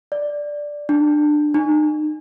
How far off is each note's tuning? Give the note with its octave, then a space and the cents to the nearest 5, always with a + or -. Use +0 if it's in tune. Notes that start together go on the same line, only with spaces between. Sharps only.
D5 +0
D4 +20
D#4 -35